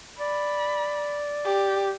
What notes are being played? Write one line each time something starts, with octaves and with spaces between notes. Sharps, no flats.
D5 B5
G4